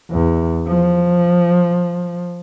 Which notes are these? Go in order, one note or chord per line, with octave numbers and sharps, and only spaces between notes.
E2
F3